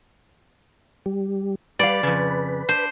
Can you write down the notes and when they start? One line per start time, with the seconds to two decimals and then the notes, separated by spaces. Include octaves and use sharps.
1.06 G3
1.79 G3 B4 D5 F5
2.03 F2 C#3
2.69 D4 C5